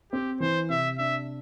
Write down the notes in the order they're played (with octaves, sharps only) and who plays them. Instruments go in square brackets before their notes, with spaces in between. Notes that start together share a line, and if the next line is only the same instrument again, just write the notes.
[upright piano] C4 [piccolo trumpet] G4
[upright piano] E3 [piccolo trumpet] C5
[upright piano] C3 [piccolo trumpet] E5
[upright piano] D4 [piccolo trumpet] E5